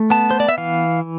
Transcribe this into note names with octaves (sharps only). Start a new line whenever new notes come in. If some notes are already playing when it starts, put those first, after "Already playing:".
Already playing: A3
B3 A5
C5
D5
E5
E3 F5